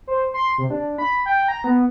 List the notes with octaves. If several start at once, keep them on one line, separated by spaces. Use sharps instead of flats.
C5
C6
C3
D4
B5
G5
A#5
B3